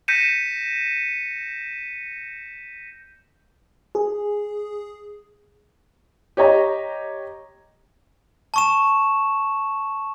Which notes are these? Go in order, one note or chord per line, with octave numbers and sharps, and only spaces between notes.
G6 A#6 B6 C#7 D#7 E7
G#4
G4 C#5 D#5 A#5
A5 C#6 E7